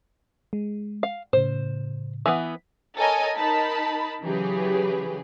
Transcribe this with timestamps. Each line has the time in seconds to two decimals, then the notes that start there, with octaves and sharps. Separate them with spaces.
0.53 G#3
1.03 F5
1.33 A2 C#3 C5
2.26 E3 B3
2.96 A4 A#4 C#5 D#5 G#5
3.37 D#4 A#4 A5 B5
4.23 C#3 E3 F#3 G4 G#4 B4